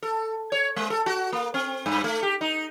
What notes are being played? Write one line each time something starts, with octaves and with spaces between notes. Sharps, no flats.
A4
C#5
G#3
A4
F#4
A#3
C4
G2
A3
G4
D#4